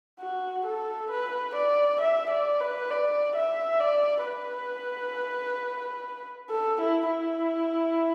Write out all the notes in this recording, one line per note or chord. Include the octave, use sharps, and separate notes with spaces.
F#4
A4
B4
D5
E5
D5
B4
D5
E5
D5
B4
A4
E4
E4